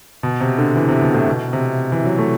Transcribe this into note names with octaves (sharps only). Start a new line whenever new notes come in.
B2
C3
D3
E3
C3
B2
A2
B2
C3
E3
F#3
A3